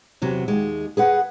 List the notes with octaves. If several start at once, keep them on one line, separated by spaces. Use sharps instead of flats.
E2 C3 F#3
D#2 G#3
G#4 B4 F#5